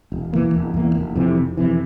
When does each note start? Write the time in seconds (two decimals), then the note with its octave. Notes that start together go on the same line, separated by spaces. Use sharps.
0.12 E1
0.33 E2 E3 A#3
0.54 E1
0.74 E2 E3 A#3
0.95 F1
1.15 F2 C3 E3
1.37 F1
1.57 F2 C3 E3